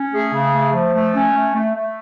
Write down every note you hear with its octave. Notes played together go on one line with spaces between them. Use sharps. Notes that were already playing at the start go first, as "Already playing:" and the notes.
Already playing: C#4
A3 G#4
C#3
A3
F3
A3
C#4
A3
A3
A3